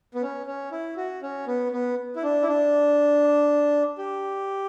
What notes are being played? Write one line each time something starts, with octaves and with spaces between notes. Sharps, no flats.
B3
C#4
C#4
E4
F#4
C#4
B3
B3
E4
D4
E4
D4
G4